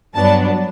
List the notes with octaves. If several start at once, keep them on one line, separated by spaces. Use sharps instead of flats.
G2 F#3 B3 D4 A5